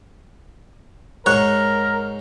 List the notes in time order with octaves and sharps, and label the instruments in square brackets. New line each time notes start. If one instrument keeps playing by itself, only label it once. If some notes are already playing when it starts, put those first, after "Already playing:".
[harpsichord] G#2 C#5 C#6 [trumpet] A#4 [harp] F#6